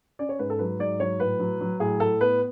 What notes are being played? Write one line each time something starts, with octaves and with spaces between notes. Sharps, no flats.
C#4 D5
C#5
G#2 B4
A4
F#3 B4
G#2 D5
F#3 C#5
A2 B4
F#3
F#3
A2 G#4
A2 A4
B3 B4